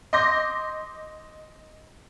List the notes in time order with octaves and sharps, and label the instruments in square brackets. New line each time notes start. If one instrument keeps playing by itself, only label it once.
[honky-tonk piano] D#5 C6 D6 G6 A#6